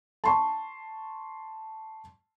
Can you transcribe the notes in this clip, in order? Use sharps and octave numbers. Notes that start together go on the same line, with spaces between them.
A5 C6 C#6